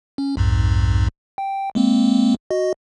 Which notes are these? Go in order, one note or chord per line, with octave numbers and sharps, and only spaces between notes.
C#4
B1 F2 G#2
G5
G#3 A#3 C4
F#4 D#5